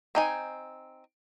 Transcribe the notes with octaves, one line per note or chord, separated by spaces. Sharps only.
C4 D#4 G#5